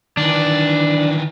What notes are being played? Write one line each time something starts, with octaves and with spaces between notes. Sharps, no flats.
D#3 E3 D4